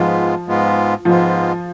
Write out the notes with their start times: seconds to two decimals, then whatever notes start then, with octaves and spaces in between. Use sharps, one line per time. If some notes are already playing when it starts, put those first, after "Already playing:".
Already playing: G#2 F3 G#3 B3 F4
0.47 G#2 G#3 B3 F4
1.05 G#2 F3 G#3 B3 F4